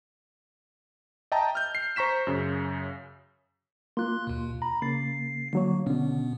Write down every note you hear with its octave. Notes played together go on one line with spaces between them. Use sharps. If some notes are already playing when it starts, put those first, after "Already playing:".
D#5 E5 G5 A5 A#5
F6 G6
C7
C5 A#5 C#6 B6 E7
F#2 C#3
A#3 F4 C6 F#6
D#2 B2
A#5 B5
C#3 A#3 A6 C7
D3 F#3 A#3 C#5
B2 D3 B3 C#4